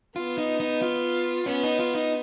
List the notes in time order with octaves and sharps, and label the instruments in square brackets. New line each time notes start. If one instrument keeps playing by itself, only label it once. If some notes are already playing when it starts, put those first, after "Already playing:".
[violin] B3 [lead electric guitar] F4
[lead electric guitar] D#4
D#4
F4
[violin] B3 [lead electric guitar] C#4
[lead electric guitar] D#4
F4
D#4